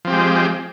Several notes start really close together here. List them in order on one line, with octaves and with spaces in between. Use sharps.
F3 C4 G4 G#3